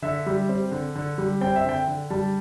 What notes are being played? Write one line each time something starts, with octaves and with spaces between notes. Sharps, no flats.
D3 E5
G3
C4
D3
D3
G3
C4 G5
E5
D3 G5
D3
G3 A5